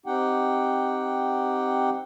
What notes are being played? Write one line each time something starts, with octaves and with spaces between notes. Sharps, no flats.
C4 D#4 G4 F#5 G5